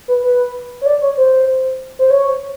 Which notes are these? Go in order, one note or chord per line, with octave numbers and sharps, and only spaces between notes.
B4
B4
C#5
D5
C#5
C5
C5
C#5